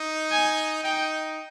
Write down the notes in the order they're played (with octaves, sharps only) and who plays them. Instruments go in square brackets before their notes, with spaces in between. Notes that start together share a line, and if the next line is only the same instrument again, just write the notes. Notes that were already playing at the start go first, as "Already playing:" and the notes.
Already playing: [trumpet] D#4
[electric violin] G#5
[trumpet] D#4 [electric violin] G5